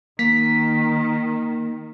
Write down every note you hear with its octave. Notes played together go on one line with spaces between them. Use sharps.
D#3 A#3 B6